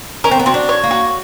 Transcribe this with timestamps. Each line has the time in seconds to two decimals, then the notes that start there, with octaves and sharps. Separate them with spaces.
0.24 C#4 A#4
0.31 C4
0.40 B3
0.46 C4 F#4
0.54 D4
0.69 C#5
0.84 A#3
0.91 F#4